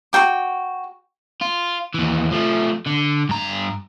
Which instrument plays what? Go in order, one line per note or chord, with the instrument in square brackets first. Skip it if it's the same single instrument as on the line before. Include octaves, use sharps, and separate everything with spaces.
[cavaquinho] F#4 A4 G5 D6
[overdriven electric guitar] F4
D#2 E3
F3 A3
D3
G2 A#5